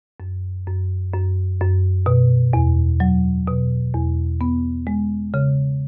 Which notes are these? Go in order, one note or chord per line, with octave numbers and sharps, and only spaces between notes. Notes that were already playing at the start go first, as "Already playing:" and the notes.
F#2
F#2
F#2
F#2
B2
E2
F#3
B2
E2
B3
G#3
C#3